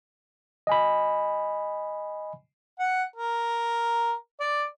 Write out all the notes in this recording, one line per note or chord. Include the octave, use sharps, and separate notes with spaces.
D#5 G#5 B5
F#5
A#4
D5